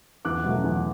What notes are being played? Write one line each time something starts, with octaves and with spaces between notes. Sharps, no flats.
E2 D6 F#6
B2 F#3 A3
E2